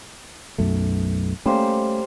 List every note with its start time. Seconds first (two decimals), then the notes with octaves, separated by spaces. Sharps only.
0.58 B1 F#2 A3
1.46 G3 A3 A#3 C#4 C5